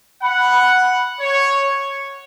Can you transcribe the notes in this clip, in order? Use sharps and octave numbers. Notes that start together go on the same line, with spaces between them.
F#5 B5
C#5